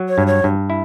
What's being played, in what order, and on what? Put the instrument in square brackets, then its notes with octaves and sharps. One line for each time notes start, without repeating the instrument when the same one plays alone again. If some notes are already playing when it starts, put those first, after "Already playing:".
Already playing: [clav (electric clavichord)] F#3
[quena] C#5
[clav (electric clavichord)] G2
[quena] C#5
[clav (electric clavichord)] G2
E4